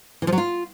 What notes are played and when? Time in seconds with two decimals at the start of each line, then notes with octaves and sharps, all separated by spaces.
0.22 E3
0.27 F3
0.32 F#3
0.38 F4